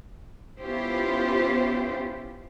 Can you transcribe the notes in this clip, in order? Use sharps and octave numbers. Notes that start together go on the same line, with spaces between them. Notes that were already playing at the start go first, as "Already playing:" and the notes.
B3 C#4 E4 F4 G4 C5